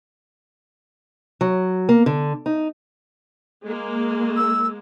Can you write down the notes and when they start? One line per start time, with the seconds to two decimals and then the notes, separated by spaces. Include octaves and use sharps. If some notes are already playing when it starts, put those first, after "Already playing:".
1.41 F#3
1.89 A#3
2.06 D3
2.46 D#4
3.64 G#3 A#3
4.36 E6